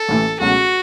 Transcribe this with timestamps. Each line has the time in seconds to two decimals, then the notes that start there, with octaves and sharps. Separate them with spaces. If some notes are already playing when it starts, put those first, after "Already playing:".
Already playing: A4
0.09 A1 A2 E3
0.40 C#2 B2 F#3 A3 C#4 F#4